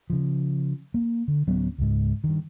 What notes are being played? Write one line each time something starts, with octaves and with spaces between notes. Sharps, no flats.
C#3 F3
A#3
D3
D1 F#3 B3 C#4
C#2 G#2
G2 D#3